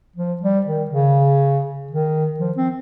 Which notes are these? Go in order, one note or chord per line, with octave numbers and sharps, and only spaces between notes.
F3
G3
D#3
C#3
D#3
F3
C4